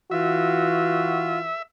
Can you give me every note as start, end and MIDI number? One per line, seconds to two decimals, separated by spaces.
0.11 1.49 52
0.11 1.39 65
0.11 1.49 66
0.11 1.62 76